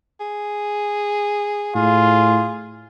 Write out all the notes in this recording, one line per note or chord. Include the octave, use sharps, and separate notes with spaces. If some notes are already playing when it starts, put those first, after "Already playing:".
G#4
A2 F4 G#4